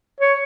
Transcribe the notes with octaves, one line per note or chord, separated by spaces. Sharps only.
C#5